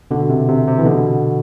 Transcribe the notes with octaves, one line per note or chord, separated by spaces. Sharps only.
B2 D3
C3
C3
C3
E3
B2 D3